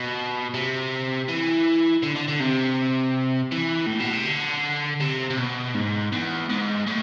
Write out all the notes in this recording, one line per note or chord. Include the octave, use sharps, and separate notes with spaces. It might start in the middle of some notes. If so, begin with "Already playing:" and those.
Already playing: B2
C3
E3
D3
D3
D3
C3
E3
A2
B2
C3
D3
C3
C3
B2
G#2
E2
G#2
A2